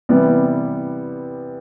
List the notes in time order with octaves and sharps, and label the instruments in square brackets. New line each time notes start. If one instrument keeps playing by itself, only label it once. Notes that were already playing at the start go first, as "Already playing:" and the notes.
[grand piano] C3 E3 G3 B3